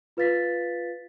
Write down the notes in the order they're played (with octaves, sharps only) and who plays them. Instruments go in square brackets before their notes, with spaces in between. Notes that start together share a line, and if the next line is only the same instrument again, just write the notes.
[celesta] F4 B4 F5 A6 B6